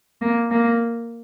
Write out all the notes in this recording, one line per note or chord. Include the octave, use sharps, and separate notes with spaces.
A#3
A#3